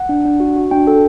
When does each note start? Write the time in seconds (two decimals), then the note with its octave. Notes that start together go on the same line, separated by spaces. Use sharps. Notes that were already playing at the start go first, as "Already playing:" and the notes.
Already playing: F#5
0.09 D4
0.25 D4
0.40 F#4
0.56 F#4
0.71 D4 G5
0.87 A4